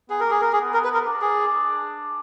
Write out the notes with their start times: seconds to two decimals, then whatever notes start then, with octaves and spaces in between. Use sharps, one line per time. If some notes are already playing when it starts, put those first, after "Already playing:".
0.10 B3 G#4
0.20 A#4
0.26 A#3 G#4
0.41 B3 A#4
0.51 A#3 G#4
0.60 B3
0.74 A#4
0.84 B4
0.94 A#4
1.05 D4
1.22 G#4